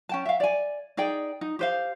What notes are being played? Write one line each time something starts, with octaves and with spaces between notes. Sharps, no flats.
C#4 G5 A5
E5 F5
D5 G#5
D#4 G#4 D5 G5
D#4
G4 C5 F5